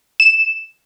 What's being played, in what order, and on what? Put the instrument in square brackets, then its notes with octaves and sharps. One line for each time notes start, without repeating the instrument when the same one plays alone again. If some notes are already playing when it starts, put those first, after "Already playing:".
[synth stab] E7